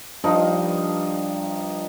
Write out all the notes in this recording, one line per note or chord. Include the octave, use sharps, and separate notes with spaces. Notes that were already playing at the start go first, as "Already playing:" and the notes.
G2 F3 D#4